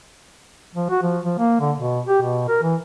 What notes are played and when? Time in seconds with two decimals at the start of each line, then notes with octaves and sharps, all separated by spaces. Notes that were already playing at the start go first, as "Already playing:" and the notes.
0.75 F3
0.90 F#4
1.03 F3
1.25 F3
1.39 A#3
1.60 D3
1.78 B2
2.08 G4
2.22 B2
2.48 A#4
2.63 E3